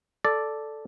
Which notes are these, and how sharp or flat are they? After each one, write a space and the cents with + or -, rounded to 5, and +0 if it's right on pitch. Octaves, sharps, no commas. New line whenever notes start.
A4 +0 D5 +0